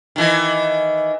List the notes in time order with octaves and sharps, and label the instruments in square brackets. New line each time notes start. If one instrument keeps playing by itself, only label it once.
[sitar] D#3 E3